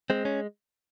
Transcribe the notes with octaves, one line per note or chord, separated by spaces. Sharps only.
G#3 C4
C#4